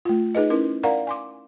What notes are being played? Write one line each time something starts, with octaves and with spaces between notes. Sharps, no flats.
A3 F4
D#4 G#4 B4 D#5
C#4 E4 A#4
A#4 D5 F5 F#5 A#5
G#5 C6 D6